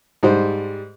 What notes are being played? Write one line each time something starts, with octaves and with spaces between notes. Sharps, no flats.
G#2 G3 C5